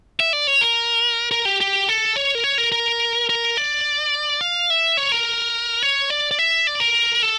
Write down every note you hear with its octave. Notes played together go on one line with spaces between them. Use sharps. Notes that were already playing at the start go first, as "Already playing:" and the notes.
E5
D5
C#5
A#4
A#4
G4
G4
A4
C#5
A#4
C#5
A#4
A#4
A#4
D5
F5
E5
C#5
A#4
C#5
D5
D5
E5
D5
A#4
A4